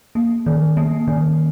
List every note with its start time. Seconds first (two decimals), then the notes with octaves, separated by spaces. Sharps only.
0.15 A#3
0.46 D#3
0.77 A#3
1.08 D#3